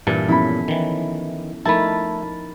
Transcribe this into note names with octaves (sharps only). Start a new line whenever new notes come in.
G2 A#2 E3 A4
F3 B3 C#4 E4 B5
D#3 E3
F3 A3 D#4 E4 A#4 A5 B5